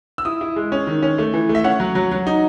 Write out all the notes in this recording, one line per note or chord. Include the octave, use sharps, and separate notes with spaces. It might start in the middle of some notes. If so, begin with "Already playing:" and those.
E6
E4 D#6
E4
G#3
C#4
D#3
C#4
A3
E3
A3
E5
C#4 F#5
F#3
F#3
F#3
D#4